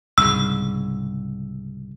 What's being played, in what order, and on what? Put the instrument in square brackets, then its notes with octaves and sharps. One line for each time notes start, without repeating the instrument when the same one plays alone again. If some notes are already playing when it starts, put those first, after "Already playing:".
[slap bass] C2 G#2 C#3 [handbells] E6